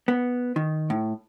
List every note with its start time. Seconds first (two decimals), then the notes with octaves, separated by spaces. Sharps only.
0.08 B3
0.56 D#3
0.90 A2